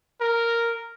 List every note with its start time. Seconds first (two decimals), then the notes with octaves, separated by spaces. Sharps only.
0.21 A#4